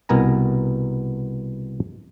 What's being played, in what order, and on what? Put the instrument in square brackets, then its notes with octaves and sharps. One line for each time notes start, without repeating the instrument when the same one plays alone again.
[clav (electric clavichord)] C2 B2 B3 A#4 G#5 A#5